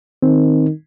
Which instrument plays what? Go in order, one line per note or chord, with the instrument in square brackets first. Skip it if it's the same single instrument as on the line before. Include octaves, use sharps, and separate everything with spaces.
[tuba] D#3 [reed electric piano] C4